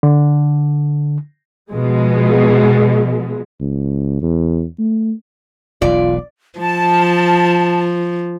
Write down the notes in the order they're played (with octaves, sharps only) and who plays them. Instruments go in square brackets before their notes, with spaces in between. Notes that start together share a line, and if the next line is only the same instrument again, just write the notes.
[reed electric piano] D3
[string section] B2 F3 G#3
[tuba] C#2
E2
A3
[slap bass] E1 B1 [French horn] F4 [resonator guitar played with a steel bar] D5
[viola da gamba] F3 [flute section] A5